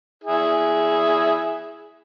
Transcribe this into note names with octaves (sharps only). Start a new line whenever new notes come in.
E4 G#4